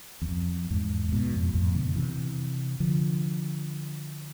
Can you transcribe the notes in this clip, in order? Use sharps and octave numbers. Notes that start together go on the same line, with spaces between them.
E2
F2
E2 G#2
A2
G#2 B2
F2
F2 A2
B2 D3
D3
C3 E3
D3 F3